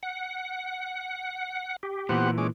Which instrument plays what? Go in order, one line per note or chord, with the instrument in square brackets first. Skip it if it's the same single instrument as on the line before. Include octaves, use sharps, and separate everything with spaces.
[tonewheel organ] F#5
G4
[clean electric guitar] A#2 E3 [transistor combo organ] B3 C5 F#5
[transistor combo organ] G#3 C#4 D6